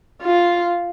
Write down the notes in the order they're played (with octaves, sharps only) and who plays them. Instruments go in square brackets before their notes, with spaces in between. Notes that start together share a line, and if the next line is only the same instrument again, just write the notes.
[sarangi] F4